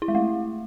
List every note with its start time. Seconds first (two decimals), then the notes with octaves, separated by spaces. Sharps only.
0.02 E4
0.08 G#3
0.15 A3